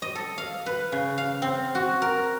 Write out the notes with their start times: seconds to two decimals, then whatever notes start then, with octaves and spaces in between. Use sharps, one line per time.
0.02 D#5
0.15 A4
0.38 F5
0.66 B4
0.92 C#3
1.18 F5
1.42 C4
1.75 F#4
2.02 A#4